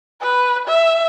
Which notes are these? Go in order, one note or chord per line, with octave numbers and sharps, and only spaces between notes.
B4
E5